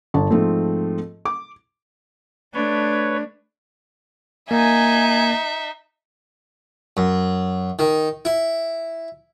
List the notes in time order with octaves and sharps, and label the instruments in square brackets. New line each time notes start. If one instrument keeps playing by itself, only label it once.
[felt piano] G1 A5
G#2 F3 A3 C4
D6
[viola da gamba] A3 D4 [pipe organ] B4 C#5
[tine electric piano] A#3 [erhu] D#4 [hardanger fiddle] E5 [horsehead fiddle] G#5
[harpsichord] F#2
D#3
E4